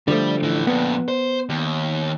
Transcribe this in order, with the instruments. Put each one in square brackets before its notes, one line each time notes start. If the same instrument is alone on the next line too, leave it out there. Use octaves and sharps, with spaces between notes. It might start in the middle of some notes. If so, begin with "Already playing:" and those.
[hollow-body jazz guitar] D3 F3 A3 [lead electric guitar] G3
[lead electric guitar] A2 E3
[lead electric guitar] F2 A#2 [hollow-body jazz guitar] B3
[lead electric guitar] C5
D#2